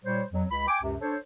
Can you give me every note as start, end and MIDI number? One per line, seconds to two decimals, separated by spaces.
0.04 0.23 46
0.04 0.23 55
0.04 0.23 72
0.04 0.23 73
0.33 0.43 41
0.33 0.43 54
0.50 0.66 37
0.50 0.66 83
0.68 0.80 79
0.68 0.80 80
0.68 0.80 86
0.83 0.95 37
0.83 0.95 42
0.83 0.95 48
1.01 1.17 62
1.01 1.17 69
1.01 1.17 72
1.01 1.17 73